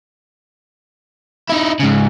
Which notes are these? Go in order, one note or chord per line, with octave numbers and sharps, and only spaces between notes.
D#4 E4
G#2 C#3